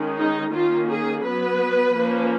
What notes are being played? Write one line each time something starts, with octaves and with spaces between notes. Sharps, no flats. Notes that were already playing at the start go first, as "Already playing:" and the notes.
Already playing: D#3 G#3 C#4
D#4
D#3 A#3 C#4 F4
G#4
F#3 B3 B4
F3 A#3 C#4